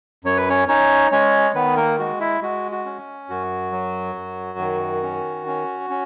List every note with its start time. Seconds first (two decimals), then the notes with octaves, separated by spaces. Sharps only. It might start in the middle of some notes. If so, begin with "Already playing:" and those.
0.24 F#2 C#5
0.37 B4
0.50 C#4 C#5
0.68 C#4 D#4 C#5
1.12 G#3 C#4 C#5
1.55 D#3 B3 B4
1.77 A#3 A#4
1.99 G#3 F#4
2.20 E4 E5
2.42 G#3 F#4
2.72 F#4
2.86 C#4
3.30 F#2 F#4
3.72 F#3
4.15 F#2
4.59 D#3
5.03 C#4
5.47 C#4
5.90 C#4